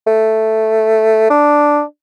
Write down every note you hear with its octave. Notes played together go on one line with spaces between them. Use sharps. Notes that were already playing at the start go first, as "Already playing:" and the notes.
A3
D4